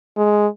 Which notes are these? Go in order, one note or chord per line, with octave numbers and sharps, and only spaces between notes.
G#3